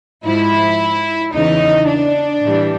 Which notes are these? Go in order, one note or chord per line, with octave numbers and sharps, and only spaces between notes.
G#2 F3 E4
E2 C#3 E3 D#4
D4
A2 E3 G3